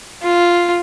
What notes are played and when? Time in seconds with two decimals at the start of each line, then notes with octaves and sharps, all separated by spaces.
0.22 F4